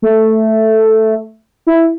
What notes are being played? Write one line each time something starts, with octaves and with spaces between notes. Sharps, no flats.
A3
E4